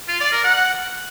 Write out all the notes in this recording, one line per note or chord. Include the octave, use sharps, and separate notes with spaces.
F4
D5
A#4
F#5